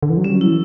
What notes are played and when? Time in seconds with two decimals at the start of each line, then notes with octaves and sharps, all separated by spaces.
0.03 D3
0.10 E3
0.17 F#3
0.24 G3 C#4
0.35 F#3
0.41 E4
0.47 E3